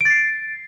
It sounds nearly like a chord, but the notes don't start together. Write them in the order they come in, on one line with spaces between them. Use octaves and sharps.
D7 A6 C7